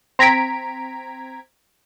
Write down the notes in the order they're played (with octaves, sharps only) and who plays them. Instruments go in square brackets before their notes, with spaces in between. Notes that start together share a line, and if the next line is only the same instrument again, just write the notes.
[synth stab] C4 A#5 G#6 B6 D7